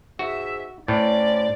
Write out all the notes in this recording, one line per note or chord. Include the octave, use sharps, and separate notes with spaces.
G#2 F#4 E5
A2 C#4 C5 D5